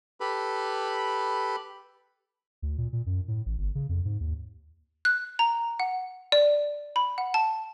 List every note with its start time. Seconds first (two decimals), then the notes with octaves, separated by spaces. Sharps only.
0.20 G4 A4 B4 B5
2.62 D2
2.78 A#2
2.93 A#2
3.06 F#2
3.28 A2
3.46 A1
3.58 G1
3.75 C#3
3.89 F2
4.05 G#2
4.20 D#2
5.05 F#6
5.39 A#5
5.80 F#5
6.32 D5
6.96 B5
7.18 F#5
7.34 A5